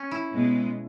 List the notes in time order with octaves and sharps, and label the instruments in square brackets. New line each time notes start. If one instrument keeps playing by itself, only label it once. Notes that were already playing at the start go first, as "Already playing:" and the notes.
Already playing: [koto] C#4
E4
[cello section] B2 G#3 B3